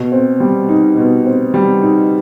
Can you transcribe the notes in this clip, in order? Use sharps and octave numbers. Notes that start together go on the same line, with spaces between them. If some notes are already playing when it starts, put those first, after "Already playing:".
Already playing: B2
C4
G3
D#4
B2
C4
G3
D#4